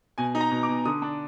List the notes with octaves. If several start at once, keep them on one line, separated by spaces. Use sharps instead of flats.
B2 G#5
D#4
A#5
B2
D6
B2
D3 D#6
D4